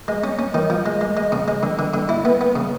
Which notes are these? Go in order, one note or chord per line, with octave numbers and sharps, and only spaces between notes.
G#3
C#4
C#4
D#3
F3
G#3
G#3
G#3
C#3
G#3
D3
D3
D3
E4
B3
B3
C#3